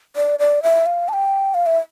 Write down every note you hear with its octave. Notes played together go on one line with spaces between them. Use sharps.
D5
D5
E5
F5
A5
G5
F5
E5